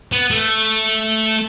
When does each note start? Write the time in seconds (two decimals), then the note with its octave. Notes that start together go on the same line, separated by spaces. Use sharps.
0.12 B3
0.31 A3